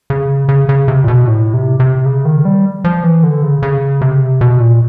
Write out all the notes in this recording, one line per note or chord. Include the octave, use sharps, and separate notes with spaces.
C#3
C#3
C#3
C3
A#2
B2
A2
C3
C3
C#3
D#3
G3
F3
E3
D3
C#3
C#3
C3
B2
A#2